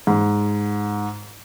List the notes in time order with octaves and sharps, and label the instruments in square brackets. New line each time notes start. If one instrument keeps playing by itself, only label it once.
[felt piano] G#2